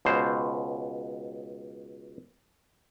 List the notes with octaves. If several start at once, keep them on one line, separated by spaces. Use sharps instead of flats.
C#2 B2 C5